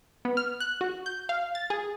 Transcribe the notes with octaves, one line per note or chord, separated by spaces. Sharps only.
B3
F6
F#6
F#4
G6
F5
A6
G#4